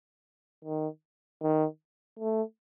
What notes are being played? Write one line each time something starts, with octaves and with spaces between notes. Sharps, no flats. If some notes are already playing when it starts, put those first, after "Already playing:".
D#3
D#3
A3